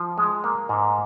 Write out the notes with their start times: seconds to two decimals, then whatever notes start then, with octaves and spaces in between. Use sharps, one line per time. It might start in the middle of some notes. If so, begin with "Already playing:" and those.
Already playing: F3
0.18 G#3
0.44 A#3
0.69 G#2